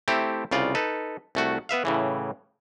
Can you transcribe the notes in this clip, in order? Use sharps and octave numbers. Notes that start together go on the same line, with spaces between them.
A3 C4 E4 G4
C2 C#3 F4 D5
D#4 A4 B4
C2 A3 F#4
B3 B4 E5 F5
A2 C#3 E3